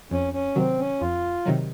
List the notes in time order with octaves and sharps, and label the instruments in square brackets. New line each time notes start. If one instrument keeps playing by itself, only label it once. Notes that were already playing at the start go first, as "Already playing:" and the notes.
[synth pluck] F2 [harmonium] C#4
[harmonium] C#4
[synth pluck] C3 D#3 F#3 [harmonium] C4
[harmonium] C#4
[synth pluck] F2 [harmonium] F4
[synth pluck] C3 D#3 F#3